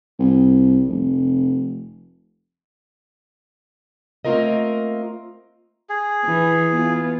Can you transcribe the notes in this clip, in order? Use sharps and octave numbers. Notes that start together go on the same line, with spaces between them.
C2
F1
A3 A#3 C4 F4 A#4 D#5
G#4
E3
B3 F4